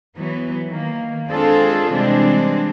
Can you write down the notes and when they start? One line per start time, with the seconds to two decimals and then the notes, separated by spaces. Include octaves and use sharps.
0.16 E3 F#3 B3
0.67 D#3 A#3
1.28 G#3 C4 D4 F4 G#4 A4
1.93 C3 E3 G3 G#3 C4 D4